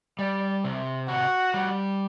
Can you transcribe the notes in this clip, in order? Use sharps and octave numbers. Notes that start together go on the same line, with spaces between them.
G3 D5
C3
F#4 F#5
G3